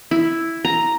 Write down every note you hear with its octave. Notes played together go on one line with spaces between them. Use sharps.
E4
A#5